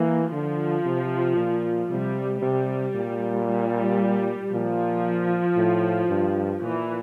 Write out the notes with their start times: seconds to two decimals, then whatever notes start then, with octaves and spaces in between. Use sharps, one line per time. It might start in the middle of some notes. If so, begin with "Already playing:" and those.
Already playing: E3 A#3
0.32 D3 F3
0.85 C3
1.37 A#2
1.90 C3 G3
2.42 C3 G3
2.95 A#2
3.47 G3
4.52 A#2 F3
5.57 A2
6.09 G2
6.62 A#2 E3